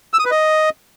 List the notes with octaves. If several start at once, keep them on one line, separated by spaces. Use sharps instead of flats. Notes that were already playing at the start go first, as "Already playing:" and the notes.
E6
D#6
B4
D#5